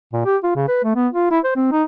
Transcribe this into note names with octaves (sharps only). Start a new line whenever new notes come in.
A#2
G4
F4
C#3
B4
A3
B3
F4
E4
C5
C4
D#4